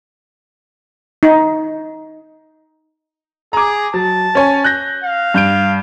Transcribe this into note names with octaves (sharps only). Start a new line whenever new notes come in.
D#4
G#4 A#5 D6
F#3 A5
C#4 C#5 G#5
F#6 G6 A#6
F5
G2 G6 D7